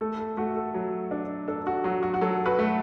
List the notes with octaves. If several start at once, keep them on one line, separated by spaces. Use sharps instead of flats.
A3 A4
A4
A3 F#4
A4
F#3
D4
D4 A4
F#4
F#3 F#4
F#4
F#4
F#3 A4
F#4 B4
A3